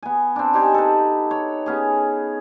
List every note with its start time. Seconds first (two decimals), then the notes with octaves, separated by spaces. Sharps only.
0.03 B3 G#5
0.36 C4 D4
0.53 D#4 G4 C5 G#5
0.74 A4 B4
1.31 C#5
1.66 B3 C#4 G#4